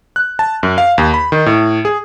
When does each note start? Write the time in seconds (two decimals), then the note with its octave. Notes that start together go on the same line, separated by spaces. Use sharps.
0.16 F#6
0.39 A5
0.63 F#2
0.78 F5
0.98 D#2
1.14 B5
1.32 D#3
1.46 A2
1.85 G#4